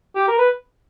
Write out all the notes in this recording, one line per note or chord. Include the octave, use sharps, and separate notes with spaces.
G4
A#4
B4